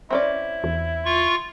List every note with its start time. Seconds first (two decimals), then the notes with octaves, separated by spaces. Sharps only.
0.11 C4 C#4 E4 D5
0.64 E2
1.05 F4 C#6